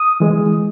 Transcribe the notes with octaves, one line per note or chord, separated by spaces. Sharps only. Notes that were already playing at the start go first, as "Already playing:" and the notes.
Already playing: D#6
E3 G#3